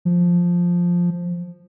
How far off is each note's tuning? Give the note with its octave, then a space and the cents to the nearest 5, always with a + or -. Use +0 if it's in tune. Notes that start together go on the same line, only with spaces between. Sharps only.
F3 +5